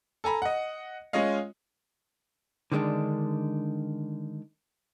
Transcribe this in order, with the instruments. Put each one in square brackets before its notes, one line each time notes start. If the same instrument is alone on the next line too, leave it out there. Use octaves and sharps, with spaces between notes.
[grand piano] A4 G#5 A#5 B5
D#5 F#5
G#3 C#4 F4 C#5 D#5 F5
[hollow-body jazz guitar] D3 D#3 G#3 C4 D4